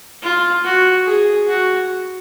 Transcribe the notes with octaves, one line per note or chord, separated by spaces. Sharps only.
F4
F#4
G#4
F#4